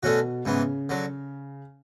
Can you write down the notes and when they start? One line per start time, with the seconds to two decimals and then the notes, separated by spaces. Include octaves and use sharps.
0.03 B2 D3 A3 C#4 F#4
0.45 G#2 C#3 E3 B3
0.89 D3 F#3